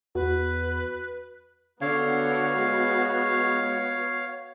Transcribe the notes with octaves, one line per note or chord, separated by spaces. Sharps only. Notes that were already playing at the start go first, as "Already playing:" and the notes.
E2 F#4 B4
D3 B3 F#4 C#5 F5
G#3